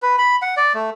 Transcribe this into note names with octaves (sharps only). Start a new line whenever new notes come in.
B4
B5
F#5
D5
A3